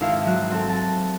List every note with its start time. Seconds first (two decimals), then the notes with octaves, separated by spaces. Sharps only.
0.01 G#1 E4 F5
0.26 F#3 F#4
0.52 C4 A4
0.69 A5